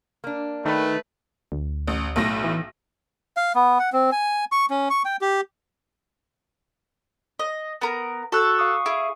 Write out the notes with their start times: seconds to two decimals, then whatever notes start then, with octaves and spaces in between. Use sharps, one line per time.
0.24 A#3 D4
0.65 D#3 A3 B4
1.52 D2
1.87 A1
2.16 B1 A2 A#6
2.44 E3
3.37 F5
3.55 B3
3.80 F#5
3.93 C4
4.12 G#5
4.52 C#6
4.70 C#4
4.90 C#6
5.05 G5
5.21 G4
7.39 D#5
7.82 B3 A#4
8.32 F#4 A4 C#6 E6 F#6
8.59 F5 C#6 D#6
8.86 E4 G#4